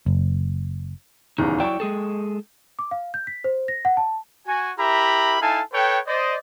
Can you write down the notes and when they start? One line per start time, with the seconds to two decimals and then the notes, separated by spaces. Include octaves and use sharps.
0.06 F#1
1.38 D#1 E2 C#3 D#4
1.60 F#3 E4 D5 G5 C#6
1.80 G#3 G#4 A4
2.79 D6
2.91 F5
3.14 G6
3.27 B6
3.44 C5
3.68 A#6
3.85 F#5
3.97 A5
4.47 F#4 G#5
4.77 E4 G4 A#4 E5 A#5 B5
5.40 D#4 E4 A4 F5 G#5 A5
5.73 A4 B4 C#5 G5
6.06 C5 D5 D#5